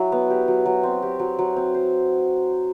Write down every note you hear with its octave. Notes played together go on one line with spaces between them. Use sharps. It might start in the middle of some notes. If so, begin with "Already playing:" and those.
Already playing: F#3 E4
B3
G4
F#3
F#3
C4
G4
F#3
F#3
C4
C5